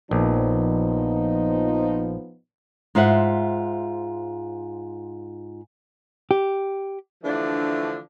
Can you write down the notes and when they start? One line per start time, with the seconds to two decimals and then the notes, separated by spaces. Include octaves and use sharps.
0.11 A#1 F3 B3 D#4
2.95 G#2 F4 C5 E5 F#5
6.31 G4
7.23 D3 E3 F3 A3 D4